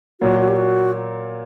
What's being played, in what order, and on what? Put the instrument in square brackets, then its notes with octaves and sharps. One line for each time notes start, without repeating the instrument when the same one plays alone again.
[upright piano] A#2 F#3 A#3 [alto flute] F#4
[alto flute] F#4
G4
F#4